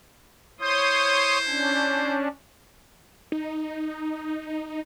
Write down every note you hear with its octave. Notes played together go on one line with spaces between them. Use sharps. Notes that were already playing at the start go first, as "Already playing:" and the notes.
E4 C5 C#5 C6 D#6
C#4 D4
D#4